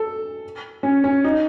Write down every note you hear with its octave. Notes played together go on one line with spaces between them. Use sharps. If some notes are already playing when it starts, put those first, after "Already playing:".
Already playing: A4
C#4
C#4
D#4